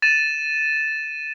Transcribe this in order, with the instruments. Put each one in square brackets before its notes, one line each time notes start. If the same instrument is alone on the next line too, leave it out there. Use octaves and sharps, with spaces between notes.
[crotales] A6 D#7 E7